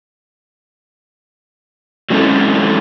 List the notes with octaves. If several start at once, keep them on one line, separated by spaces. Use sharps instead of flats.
F#3 G#3 C4 C#4 E4 A4